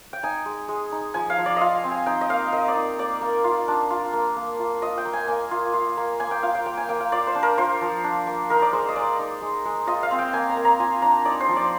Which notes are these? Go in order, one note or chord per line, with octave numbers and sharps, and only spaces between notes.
G5
D#4 G#5
G#3
G#3
D#4
F3 G#5
F5
F3
D5
F4 D#5 F5
C4
G#5
D#4 G5
D#5
A#3 F5
A#3 D#5
D5
D#4
A#3 D5
A#3
F4
D4
F4
A#3
A#3
F4
F4 D#5
G5
A#3
G#5
A#3 G#5
F4
F4
A#3
A#3 G#5
G5
F4 F5
G5
A#3 G5
G#5
A#3 G5
F5
F4 D5
C5
D4
A#4
F4 C5
F3
D4
A#3
D#4 A#4
D5
G#3 C5
D#5
G#3 D5
D#4
G#3
G#3
F4 D#5
F5
C4
G5
A#3 G#5
A#5
A#3
A#5
F4 G#5
D4 A#5
D#4 D5
C5
F3
D5